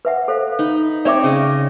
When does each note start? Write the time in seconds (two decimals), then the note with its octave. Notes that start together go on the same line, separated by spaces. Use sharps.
0.05 B4 E5 F#5
0.28 A4 C5 F5
0.59 D#4 B5
1.05 C4 C#5 D5 E5 D6
1.24 C#3 D#5